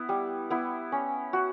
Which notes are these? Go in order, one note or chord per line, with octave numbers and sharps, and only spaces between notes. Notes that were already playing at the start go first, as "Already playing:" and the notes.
Already playing: B3 E4
G3
B3 E4
C#4
F#4